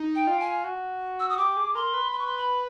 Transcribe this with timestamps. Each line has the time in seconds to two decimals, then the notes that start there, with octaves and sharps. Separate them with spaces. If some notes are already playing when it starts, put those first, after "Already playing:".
Already playing: D#4
0.15 G5
0.27 F4
0.40 G#5
0.64 F#4
1.20 E6
1.29 D#6
1.37 G4 D6
1.57 G#4
1.75 A#4 C6
1.94 B4
2.12 C6
2.19 C#6
2.26 C6
2.37 B5